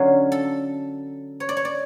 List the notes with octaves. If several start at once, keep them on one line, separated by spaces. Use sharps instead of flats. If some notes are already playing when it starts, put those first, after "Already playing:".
Already playing: D3 F#3 C#4 F4 F5
A4
C#5
D5
C#5
D5